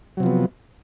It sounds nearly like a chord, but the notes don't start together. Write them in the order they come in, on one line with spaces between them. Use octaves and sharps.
F#3 C3 F3 B3